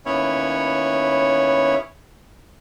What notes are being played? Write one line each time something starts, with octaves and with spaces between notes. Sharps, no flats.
D#2 B3 C#4 E4 C#5